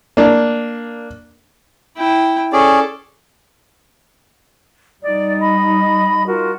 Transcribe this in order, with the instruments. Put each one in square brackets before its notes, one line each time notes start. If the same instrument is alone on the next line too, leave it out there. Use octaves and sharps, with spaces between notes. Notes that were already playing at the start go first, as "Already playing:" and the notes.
[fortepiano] A#3 D4
[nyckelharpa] E4 G5
[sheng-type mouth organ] C#4 G#4 D5 [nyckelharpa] A4
[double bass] G3 D#4 [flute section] D5
[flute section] D#5 B5
F4 F#4 A#4